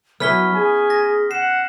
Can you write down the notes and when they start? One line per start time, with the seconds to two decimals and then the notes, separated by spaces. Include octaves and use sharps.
0.20 F#3 B3 C#4 E4 F6 B6 G7
0.55 G#4 G#5
0.90 A#6
1.31 F#5 C7 E7